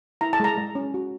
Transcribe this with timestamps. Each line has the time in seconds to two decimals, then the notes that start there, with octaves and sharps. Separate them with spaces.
0.21 E4 A#5
0.33 A5
0.40 G#3 A#5
0.58 G#3
0.75 C#4
0.94 F#4